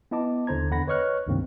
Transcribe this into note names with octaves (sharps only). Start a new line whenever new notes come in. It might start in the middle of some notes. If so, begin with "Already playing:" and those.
B3 E4 D#5 A5 D6
D#2 D3 D4 C5 A#5 G#6
E2 D3 F#5 B5 A#6
B4 C#5 D#5 C#6 F6 F#6
C#2 G2 C3 D#3 A#3 C4